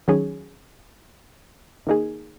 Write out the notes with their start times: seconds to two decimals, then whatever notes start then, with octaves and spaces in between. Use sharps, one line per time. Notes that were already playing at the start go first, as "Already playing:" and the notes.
0.08 D#3 F#3 C#4 G#4
1.87 D#3 A#3 D#4 G#4